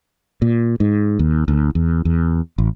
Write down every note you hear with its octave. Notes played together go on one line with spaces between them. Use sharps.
A#2
G#2
D#2
D2
E2
E2
A1